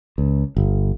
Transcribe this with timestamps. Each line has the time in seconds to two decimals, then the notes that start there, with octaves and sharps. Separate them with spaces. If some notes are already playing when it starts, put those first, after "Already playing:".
0.18 C#2
0.57 G1